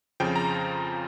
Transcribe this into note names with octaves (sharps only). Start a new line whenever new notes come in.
F2 C#3 F3 G5
A#5